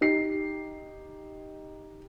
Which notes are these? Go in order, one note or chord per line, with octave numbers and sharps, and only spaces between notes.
D#4 G4 C7